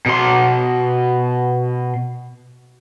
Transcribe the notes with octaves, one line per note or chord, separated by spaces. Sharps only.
B2 C6